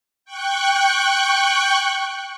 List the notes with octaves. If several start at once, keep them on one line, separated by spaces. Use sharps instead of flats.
G5 C#6 F#6